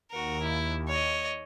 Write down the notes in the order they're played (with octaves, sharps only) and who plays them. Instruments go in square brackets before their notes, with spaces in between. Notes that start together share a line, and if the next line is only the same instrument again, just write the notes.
[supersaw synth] D#2 [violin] F#4 A#4
[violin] E4
C#5 D#5